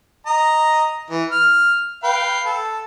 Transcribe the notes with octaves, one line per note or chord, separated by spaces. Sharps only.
D#5 A#5
E3
F6
B4 F5 G5
A4